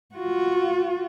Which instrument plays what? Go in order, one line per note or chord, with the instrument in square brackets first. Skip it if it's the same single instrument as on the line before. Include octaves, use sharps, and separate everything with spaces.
[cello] F4 F#4